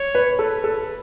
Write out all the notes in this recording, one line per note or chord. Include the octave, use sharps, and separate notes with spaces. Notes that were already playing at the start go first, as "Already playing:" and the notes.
Already playing: C#5
B4
A4 B4
A4